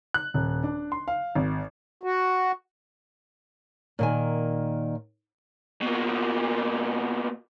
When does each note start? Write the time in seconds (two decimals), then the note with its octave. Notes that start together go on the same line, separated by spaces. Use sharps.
0.14 F#6
0.34 D#1
0.63 D4
0.92 C6
1.08 F5
1.35 G#1
2.03 F#4
3.99 A#2 D#3 G#5
5.82 B2 A#3